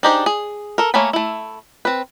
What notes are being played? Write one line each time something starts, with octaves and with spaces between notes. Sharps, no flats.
D4 D#4 G4 G#4 C5
G#4
A4 A#4
A3 A#3 C#5 G#5 B5
A3 E4
C4 B4